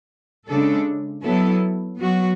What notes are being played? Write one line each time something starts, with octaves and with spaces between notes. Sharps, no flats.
C#3 G#3 D4 A4
F#3 B3 E4 A4
F#3 B3 F#4